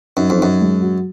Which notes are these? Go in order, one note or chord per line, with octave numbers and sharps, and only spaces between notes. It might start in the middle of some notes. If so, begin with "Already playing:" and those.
F#2 D#4
F2
F#2 D#4
G#3
F#4